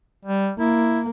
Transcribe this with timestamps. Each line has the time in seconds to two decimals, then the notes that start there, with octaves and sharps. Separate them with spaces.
0.25 G3
0.59 A#3 E4